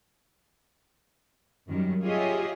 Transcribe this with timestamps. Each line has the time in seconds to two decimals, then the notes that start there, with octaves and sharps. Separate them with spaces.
1.69 F#2 D#3 G3
2.04 F4 G4 G#4 C#5 D#5 E5